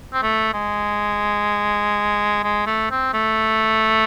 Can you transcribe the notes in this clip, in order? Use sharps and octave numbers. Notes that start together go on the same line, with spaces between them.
C4
A3
G#3
G#3
A3
C4
A3